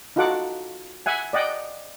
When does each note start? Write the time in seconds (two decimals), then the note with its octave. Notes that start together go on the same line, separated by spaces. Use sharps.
0.16 D#4 F4 F#4 A4 F#5 D6
1.06 E5 F#5 G#5
1.33 D5 D#5 F#5 G5